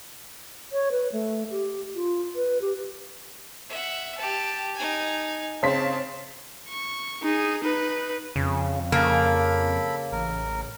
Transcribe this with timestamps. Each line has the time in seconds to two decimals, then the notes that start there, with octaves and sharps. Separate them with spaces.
0.72 C#5
0.91 B4
1.12 A3
1.51 G4
1.96 F4
2.36 B4
2.61 G4
3.69 E5 F#5
4.18 G4 A5
4.75 D#4 G#5
5.63 C#3 C4 A5 C6 B6
6.69 C#6
7.22 D#4 G#4
7.63 D#4 B4
8.36 F2 C#3
8.92 C#3 A#3 A4 B5
10.12 A1 A#4